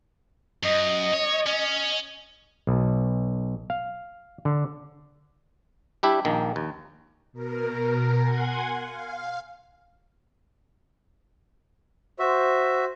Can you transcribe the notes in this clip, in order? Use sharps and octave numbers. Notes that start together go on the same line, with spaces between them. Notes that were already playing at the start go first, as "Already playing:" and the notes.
F#2 D#5
C#5
C#4
B1
F5
D3
G3 D4 E4 G4 E5
A#1 D#3 A#3
D#2
B2 A#4
F#5 G#5 C6 G#6
F5
F#4 C5 E5